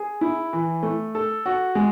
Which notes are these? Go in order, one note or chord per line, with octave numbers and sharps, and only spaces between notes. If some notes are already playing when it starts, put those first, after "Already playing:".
Already playing: G#4
E4
E3
A3
A4
F#4
G#3